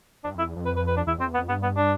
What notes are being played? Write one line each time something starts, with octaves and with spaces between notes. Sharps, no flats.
F2 D4
G2
F2 E4
E2
F2
B4
B4
B4
D4
E2 E4
F2 C4
E2
B3
F2
G2 B3
B3
D4